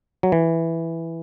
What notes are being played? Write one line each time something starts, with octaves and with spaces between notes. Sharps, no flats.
F#3
E3